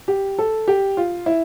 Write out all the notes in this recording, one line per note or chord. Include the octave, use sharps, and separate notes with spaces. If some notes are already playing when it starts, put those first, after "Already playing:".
G4
A4
G4
F4
E4